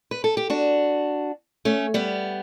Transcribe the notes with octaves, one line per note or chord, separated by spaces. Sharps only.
B4
A4
G4
D4 F#4
A3 C#4
G3 B3